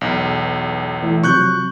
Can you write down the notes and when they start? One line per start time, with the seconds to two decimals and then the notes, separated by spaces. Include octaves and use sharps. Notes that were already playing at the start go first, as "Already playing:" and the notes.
0.01 B1 E2
1.03 E3 A3 E4
1.24 C3 F3 F#3 C#6 F#6 G6